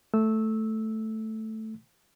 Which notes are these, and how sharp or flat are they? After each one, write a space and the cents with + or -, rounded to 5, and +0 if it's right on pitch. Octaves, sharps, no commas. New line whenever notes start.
A3 +0 E6 -10